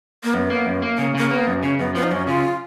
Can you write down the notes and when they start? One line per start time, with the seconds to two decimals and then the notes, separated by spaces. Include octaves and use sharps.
0.24 A#3
0.34 F#2 B3
0.50 A#3
0.66 F#2
0.82 A#3
0.97 C#3 A#3
1.15 C#3 A#3
1.30 A#3 B3
1.47 F#2
1.63 C#3 C#4
1.79 F#2 B3
1.95 F3 B3
2.03 D#4
2.11 F#2 C#4
2.27 C#3 F4